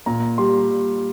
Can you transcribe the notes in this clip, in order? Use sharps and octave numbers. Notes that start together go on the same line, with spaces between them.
A#2 A#5
G3 C6